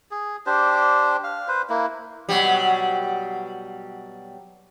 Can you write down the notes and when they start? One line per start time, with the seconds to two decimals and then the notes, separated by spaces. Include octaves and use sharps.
0.11 G#4
0.46 D4 G4 C5
1.24 F5
1.48 B4 C5
1.70 A#3 E4
2.29 B2 F#3 G3